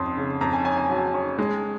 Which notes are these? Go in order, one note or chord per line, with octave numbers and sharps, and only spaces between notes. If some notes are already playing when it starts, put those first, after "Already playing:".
Already playing: F2 C#4 C6 D#6
C#3
F2 A#5
G#5
C#4 G#5
G#5
F#3
C#4
G#3